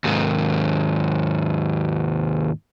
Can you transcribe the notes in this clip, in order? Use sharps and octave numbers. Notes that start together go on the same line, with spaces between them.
D#2 G#2